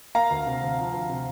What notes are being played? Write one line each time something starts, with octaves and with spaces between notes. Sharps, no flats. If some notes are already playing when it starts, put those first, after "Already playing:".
A#3 F5 A#5
D2
C3
D2
F3
D2
C3